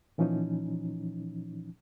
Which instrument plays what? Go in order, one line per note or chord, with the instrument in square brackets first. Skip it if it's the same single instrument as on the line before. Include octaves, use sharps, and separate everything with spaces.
[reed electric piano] A#2 E3 F3 C#4 D#4